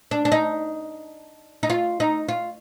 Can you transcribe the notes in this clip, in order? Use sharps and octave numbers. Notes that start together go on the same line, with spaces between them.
D4
D4
D#4
D#4
F4
D#4
F4